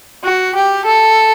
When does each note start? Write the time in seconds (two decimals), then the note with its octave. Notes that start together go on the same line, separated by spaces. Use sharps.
0.24 F#4
0.55 G4
0.85 A4